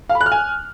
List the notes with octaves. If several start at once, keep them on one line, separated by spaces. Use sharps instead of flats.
F5
B5
F#6
F6
G#5